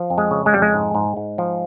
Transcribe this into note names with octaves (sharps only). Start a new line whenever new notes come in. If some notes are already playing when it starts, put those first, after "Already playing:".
Already playing: F3
F2
G#3
C#3
G#3
F2 G3
G#3
G#2
G#2
G#2
F3